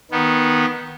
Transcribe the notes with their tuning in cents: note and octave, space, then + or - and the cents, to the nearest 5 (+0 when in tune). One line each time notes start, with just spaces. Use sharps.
D#3 +0 B3 -15